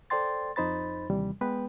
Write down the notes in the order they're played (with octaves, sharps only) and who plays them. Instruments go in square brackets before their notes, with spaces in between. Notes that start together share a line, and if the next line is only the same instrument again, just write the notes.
[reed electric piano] A4 C5 D5 G5 C6 A6
F2 D#4 C5 B5 A6
D#2 C3 E3 G3
G#3 B3 B4 G5